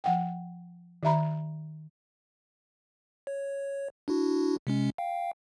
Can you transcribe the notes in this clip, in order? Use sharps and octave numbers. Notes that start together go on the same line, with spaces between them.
F3 F#5 G5
D#3 G4 E5 A#5 B5
C#5
D4 E4 F#4
C3 G#3 C#4
F5 G5